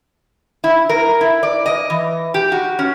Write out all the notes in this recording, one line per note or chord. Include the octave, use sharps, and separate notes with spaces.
E4
A#4
E4
D5
D#5
E3
G4
F#4
C#4